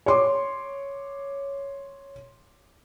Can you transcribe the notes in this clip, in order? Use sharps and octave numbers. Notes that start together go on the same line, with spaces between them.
C#5 C6 D6